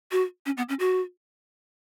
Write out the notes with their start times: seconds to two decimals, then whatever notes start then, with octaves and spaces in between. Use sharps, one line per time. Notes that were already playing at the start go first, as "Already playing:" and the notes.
0.11 F#4
0.46 C#4
0.57 B3
0.69 C#4
0.80 F#4